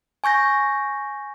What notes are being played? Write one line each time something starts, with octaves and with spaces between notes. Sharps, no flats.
G#5 C#6 G6 A#6